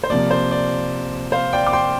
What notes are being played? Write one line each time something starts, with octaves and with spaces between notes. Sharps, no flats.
C5
C3 F3 A#3 D5
C5
D5
C5 F5
D5 G5
D6
G5 C6